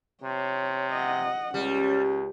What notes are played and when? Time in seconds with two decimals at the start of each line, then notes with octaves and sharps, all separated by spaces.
0.24 C3 C#5
0.92 D#5 F#5
1.54 C#2 G3 C#4